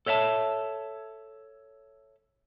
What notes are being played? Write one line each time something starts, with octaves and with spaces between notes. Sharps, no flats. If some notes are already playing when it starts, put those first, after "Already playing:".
A4 C#5 E5 F5 A5